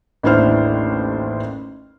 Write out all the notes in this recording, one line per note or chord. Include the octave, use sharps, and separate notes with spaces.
A1 D#2 D4 E4 C5 F6